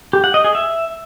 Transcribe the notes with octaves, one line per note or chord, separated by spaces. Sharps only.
G4
F#5
D#5
G#4
E5